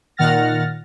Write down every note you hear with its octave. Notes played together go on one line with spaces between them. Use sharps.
A#2 D#3 F#5 F6 A6 A#6